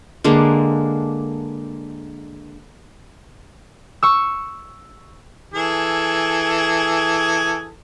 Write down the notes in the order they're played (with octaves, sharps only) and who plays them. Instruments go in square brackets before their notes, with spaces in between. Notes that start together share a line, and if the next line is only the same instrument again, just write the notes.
[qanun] D3 G#3 A#3 D4
[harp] C#6 E6
[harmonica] E3 G#4 A4